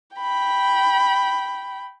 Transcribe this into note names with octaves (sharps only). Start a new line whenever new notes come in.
G5 B5